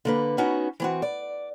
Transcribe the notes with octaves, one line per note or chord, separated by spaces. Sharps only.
D3 A#3 B4
B3 C#4 D#4 F#4
E3 C4 F#4
D5